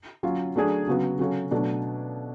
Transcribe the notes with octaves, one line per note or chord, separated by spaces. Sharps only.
F#3 C#4 F4
F#3 A3 D4 G#4
C#3 F#3 B3 F#4
C#3 F#3 C#4 F#4 A4
B2 F#3 A3 D4